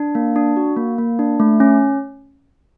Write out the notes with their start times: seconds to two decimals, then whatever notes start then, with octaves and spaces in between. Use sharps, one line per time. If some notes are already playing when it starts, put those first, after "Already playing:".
Already playing: D4
0.15 A#3
0.36 D4
0.57 F#4
0.77 A#3
0.98 A#3
1.19 D4
1.40 A3
1.60 C#4